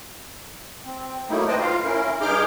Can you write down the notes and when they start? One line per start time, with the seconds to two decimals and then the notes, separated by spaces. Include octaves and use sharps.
0.85 C4
1.29 F#3 A3 A#3 D#4 E4
1.48 B4 C5 D#5 G5 A5
1.60 F4 F5
1.84 C#4 E4 A#4
2.21 G2 D#4 G#4 D6 F6 G6